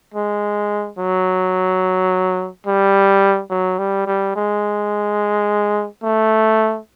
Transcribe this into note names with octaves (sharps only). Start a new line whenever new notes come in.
G#3
F#3
G3
F#3
G3
G3
G#3
A3